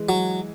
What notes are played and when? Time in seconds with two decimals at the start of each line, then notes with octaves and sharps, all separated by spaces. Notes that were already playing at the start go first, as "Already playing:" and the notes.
Already playing: E3 G#3
0.09 F#3